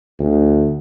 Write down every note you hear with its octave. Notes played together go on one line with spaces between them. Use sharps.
D2